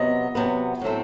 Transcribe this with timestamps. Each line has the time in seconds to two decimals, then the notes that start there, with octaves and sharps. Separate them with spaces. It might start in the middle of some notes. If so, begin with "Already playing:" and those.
Already playing: C3 F#3 B3 D#5
0.35 C3 F#3 B3
0.82 A2 F#3 A3 C4